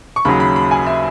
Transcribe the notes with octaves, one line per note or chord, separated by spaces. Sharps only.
C#6
D#2 C#3 F#3 B5
B5
B5
G#5
E5